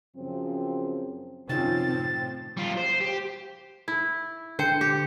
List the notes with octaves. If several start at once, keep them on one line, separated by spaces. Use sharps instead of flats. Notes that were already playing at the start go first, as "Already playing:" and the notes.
F#2 C#3 F3 C4
F#2 C3 D#3 F3 C4 C#4 A6
A2 C4
G3 F4
C5
G4
E4
D3 C5 G5 C#7
G4